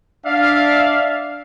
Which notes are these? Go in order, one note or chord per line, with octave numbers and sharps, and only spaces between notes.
D4 D5 E5 F5